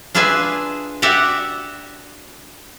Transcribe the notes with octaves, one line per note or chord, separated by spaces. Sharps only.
D4 F4 G#4 B4 E5 G#5
F#4 G4 D5 E5 F#5